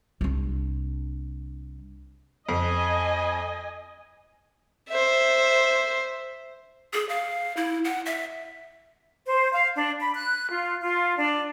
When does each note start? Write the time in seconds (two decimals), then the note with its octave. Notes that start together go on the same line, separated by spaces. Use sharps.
0.21 C2 D4
2.49 F2 D#5 G#5
4.89 C5 E5
6.93 G#4
7.09 F5
7.57 E4
7.85 F#5
8.06 E5
9.26 C5
9.52 F5
9.76 D4
10.01 B5
10.14 F#6
10.50 F4
10.82 F4
11.17 D4